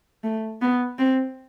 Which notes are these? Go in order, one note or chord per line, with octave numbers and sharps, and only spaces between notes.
A3
B3
C4